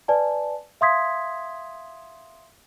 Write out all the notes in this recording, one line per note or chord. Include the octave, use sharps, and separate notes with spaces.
B4 D5 G#5 A5
E5 F5 C6 D#6 G#6 B6